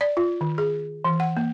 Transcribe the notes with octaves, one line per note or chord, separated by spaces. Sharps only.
D5
F4
D#3
G#4
E3
F#5
A#3